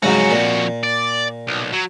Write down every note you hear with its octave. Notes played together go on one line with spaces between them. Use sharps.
F2 G#2 C#3 F#3 F#4
A#2
D5
B1
F#3